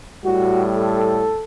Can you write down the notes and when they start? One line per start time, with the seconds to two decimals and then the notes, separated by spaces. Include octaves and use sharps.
0.24 A2 G3 F#4
0.76 A4